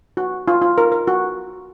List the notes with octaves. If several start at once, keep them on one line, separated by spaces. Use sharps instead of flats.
F#4
F4
F4
A#4
A#4
F#4